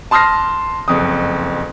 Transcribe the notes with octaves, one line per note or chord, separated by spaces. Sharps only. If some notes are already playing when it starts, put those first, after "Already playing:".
A5 C6 D#6 F6 A#6 C7
F#1 F2 D#6